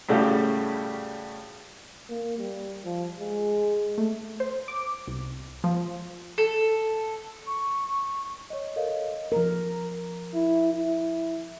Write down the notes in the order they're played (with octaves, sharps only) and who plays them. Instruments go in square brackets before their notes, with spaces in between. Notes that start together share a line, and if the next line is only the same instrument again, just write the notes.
[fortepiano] A2 C#3 G3 A3 F#4 G4
[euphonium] A#3
G3
F3
G#3
[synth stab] A3
C5
D6
C2
F3
[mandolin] A4
[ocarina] C#6
[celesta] C#5 D#5
A4 A#4 C#5 D#5 F5
[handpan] F3 A#4
[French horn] E4
E4